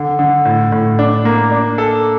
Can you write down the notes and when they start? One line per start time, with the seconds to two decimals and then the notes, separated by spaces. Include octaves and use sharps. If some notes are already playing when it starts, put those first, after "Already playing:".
Already playing: D3
0.19 D3
0.45 A2
0.72 A2
0.99 D4
1.25 A#3
1.51 D4
1.78 A4